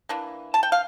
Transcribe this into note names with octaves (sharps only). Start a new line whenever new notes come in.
E3 A#3 D4
A5
G5
F5